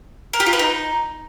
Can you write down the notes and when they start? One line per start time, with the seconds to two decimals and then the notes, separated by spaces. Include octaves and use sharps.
0.33 A#4
0.40 G4
0.46 F4
0.53 B4
0.59 D#4